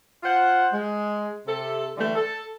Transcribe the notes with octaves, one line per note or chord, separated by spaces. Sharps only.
F4 C5 F#5
G#3
C3 A4
D3 E3 G3 A3
A4